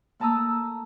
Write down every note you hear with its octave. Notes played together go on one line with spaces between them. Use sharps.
A3 A#3 A5 A#5 D#6 E6